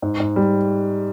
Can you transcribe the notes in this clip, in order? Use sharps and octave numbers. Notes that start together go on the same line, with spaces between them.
G#2
G#2
G3